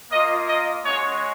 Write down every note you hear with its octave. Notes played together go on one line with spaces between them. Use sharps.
A#3 F4 D#5
D#5
G#3 C#4 F#4 C#5